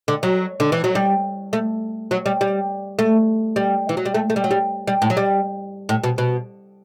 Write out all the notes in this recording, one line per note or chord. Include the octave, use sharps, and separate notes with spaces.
D3
F#3
D3
E3
F#3
G3
A3
F#3
G3
G3
A3
G3
E3
F#3
G3
A3
A3
G3
F#3
G3
G3
A2
F#3
G3
A2
B2
B2